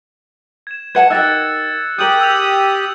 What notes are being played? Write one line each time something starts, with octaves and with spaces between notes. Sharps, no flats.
G#6 E7
B4 F#5 A5 G#6 C#7
D#4 G4 A#4 E6 F#6 A6
G4 G#4 A#4 D#6 G6 F#7
E6 F7